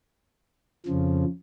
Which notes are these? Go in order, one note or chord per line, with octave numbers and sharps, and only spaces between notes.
F2 C#3 F3